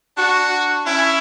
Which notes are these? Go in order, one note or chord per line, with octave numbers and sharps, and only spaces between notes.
D4 F#4
C#4 E4